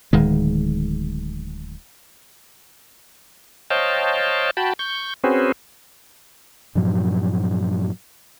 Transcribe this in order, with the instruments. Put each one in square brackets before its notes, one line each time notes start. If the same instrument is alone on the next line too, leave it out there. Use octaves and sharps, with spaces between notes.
[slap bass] D1 D#3 G#3
[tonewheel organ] C5 C#5 D#5 F5 G5 A5
F#4 G5 A5 B5
C#6 G6
C4 C#4 F#4 G#4 B4 C5
[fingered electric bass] G2 A#2 F3 F#3